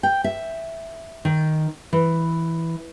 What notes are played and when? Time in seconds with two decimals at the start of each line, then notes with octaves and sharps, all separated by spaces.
0.03 G5
0.24 E5
1.25 D#3
1.93 E3